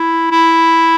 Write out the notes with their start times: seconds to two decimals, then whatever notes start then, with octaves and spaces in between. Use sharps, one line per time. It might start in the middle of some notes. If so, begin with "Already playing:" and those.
Already playing: E4
0.31 E4